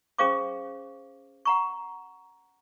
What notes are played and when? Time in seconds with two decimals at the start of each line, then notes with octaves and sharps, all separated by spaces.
0.18 C#4 G#4 C5 F5 C#6 D6
1.45 F#5 A#5 C#6